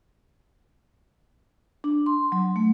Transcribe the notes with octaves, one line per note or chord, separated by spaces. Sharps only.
D4
C6
F#3
A3